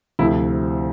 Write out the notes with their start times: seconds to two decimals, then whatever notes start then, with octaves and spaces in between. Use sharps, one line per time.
0.19 D2 C3 F3 E4